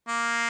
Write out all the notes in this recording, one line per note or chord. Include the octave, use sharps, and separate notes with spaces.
A#3